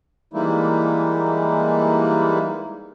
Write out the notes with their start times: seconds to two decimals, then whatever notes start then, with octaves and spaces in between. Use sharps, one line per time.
0.34 E3 G3 G#3 A#3 D#4 E4